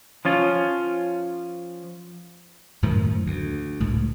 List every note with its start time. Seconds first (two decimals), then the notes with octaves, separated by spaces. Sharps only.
0.25 F3 C#4 F4
2.82 F#2 A2 D#3 F3
3.26 D2
3.80 C#2 A2